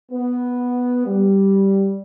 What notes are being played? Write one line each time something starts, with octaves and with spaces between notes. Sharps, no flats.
B3
G3